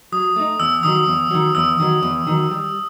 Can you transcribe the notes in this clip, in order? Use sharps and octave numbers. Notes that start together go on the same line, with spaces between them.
F#3 D#6
A3 D#4
E2 E6
D#3 F#3 D#6
E2
D#3 F#3
E2 E6
D#3 F#3
E2
D#3 F#3
G3